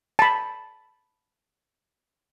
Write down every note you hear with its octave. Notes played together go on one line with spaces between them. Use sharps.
A5 B5